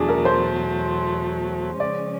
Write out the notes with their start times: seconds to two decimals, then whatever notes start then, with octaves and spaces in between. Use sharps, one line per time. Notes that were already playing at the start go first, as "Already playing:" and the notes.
Already playing: E2 B2 F#3 A3 D4 G#4
0.09 A#4
0.25 C5
1.80 C#3 F3 G#3 C#4 D5